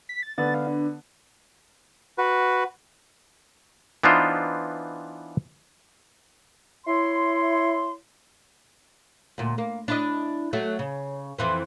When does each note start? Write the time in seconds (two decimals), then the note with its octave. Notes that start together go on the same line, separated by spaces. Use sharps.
0.09 B6
0.23 A6
0.38 D3 B3 A6
0.54 F5
0.67 D4
2.18 F#4 B4
4.03 E3 B3 D4 D#4 F4 C5
6.86 E4 C#5 C6
9.38 D2 A#2
9.58 A#3
9.88 D4 E4 D#5
10.53 F#3 A3
10.79 C#3
11.38 F2 E3 C4